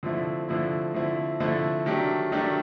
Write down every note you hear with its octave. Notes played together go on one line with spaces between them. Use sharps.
D3 F3 A3 C4 E4
D3 F3 A3 C4 E4
D3 F3 A3 C4 E4
D3 F3 A3 C4 E4
D#3 F#3 A3 D4 G4
D#3 F#3 A3 D4 G4